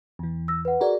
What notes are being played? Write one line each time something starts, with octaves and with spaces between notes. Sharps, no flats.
E2 E3
E6 A#6
B4 F#5
F#4 G#4 A#4 D5 A#5